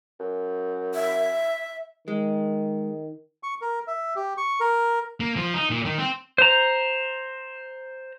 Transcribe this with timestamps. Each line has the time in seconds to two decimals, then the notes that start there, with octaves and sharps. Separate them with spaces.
0.20 F#2
0.94 E5
2.08 D#3 G#3
3.43 C#6
3.61 A#4
3.87 E5
4.16 G4
4.37 C#6
4.60 A#4
5.20 A#3
5.36 F3
5.54 D#4
5.70 A#2
5.85 D#3
5.98 C4
6.38 C5 A#5